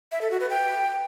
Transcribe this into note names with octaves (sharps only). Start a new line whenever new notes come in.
E5
A4
F#4
B4
G5